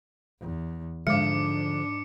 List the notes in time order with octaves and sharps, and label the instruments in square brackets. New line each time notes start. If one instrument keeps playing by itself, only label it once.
[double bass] E2
[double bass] G#2 D4 [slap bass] D3 F3 [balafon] G#3 F5 [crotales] D6 C#7